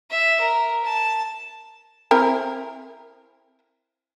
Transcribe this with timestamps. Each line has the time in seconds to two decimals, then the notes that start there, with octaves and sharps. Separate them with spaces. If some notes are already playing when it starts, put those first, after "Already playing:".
0.11 E5
0.40 A#4
0.85 A5
2.11 C4 E4 A#4